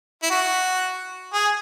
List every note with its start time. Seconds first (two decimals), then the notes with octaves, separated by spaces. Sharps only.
0.23 E4
0.30 F#4
1.34 G#4